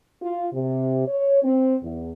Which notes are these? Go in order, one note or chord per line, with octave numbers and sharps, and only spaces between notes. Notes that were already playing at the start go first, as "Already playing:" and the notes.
F4
C3
C#5
C4
E2